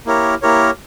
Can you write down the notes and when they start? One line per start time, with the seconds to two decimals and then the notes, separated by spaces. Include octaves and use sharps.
0.06 A#3 E4 G4 A#4 C#5
0.42 A#3 E4 G4 A#4 C#5